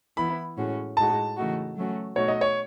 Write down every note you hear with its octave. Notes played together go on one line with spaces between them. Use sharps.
E3 B3 E4 B5
A2 G#3 C#4 F#4
A2 G#3 D#4 F#4 A5
C#3 E3 A3 D#4 F#4
F#3 A3 C#4 F#4
B2 A3 D#4 F#4 C#5
D#5
C#5